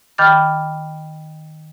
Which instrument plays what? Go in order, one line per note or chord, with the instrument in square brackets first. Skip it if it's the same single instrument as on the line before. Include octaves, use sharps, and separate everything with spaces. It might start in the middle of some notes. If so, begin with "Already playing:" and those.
[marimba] D#3 G5 B5 D6 F6 A6